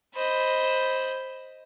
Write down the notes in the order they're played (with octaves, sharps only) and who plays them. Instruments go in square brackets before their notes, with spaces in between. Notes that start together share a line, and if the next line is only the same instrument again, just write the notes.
[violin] C5 [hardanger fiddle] D#5 B5